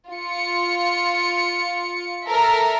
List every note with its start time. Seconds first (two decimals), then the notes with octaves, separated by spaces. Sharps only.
0.10 F4 C#7
2.27 A4 A#4 E5